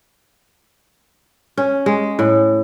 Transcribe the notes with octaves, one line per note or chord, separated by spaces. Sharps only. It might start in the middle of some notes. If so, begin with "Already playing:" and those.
C#4
G#3
A2